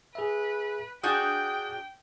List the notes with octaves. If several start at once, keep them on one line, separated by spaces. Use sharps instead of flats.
G#4 B4 E5
D4 F#4 G#4 G5 D#6 G6